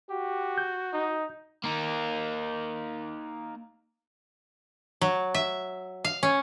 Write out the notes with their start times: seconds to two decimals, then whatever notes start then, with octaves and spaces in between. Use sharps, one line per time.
0.10 F#4 G4
0.58 G6
0.93 D#4
1.64 A#3 D#4
5.01 F#3
5.34 E5
6.04 F5
6.23 C#4